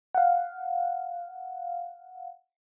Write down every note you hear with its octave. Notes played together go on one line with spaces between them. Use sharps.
F5 F#5